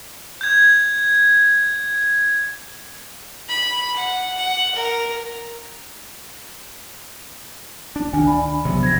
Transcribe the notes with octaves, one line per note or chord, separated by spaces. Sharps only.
G6 G#6
B5
F#5
F#5
A#4
D4
D2 D#3 D4 G#5
D5 B5
C3 F#3 B3
B1 F2 G#6 A#6